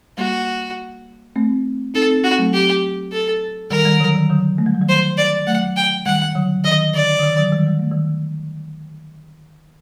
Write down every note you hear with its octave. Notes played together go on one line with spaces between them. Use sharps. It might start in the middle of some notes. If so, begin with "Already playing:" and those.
G3 A#3 F#4
A3 C4
C4 D#4 A4
C4 D#4
C4 D#4 F#4
F#3 A3
G4
A4
D#3 G3 A#4
D#3 G3
D3 F#3
D#3
D3 F#3
A3
G3
F#3
D#3 G3
C5
D5
F#3 A3 F#5
G5
D#3 G3 F#5
D3 F#3
D#3 D#5
D3 D5
D3
D#3
D3 F#3
D#3 G3
G3
A3
D#3 G3